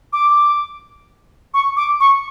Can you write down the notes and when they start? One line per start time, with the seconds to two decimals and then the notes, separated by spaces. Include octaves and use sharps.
0.13 D6
1.54 C#6
1.77 D6
2.00 C#6